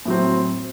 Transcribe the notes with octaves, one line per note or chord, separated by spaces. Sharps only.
A2 F#3 C4